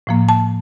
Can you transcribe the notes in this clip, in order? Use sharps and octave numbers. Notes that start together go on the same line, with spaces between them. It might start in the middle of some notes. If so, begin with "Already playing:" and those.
A2 F3 A#3
A5